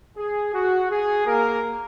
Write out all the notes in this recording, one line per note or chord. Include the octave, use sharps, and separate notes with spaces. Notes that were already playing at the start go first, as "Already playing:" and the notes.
G#4
F#4
G#4
A#3 A#4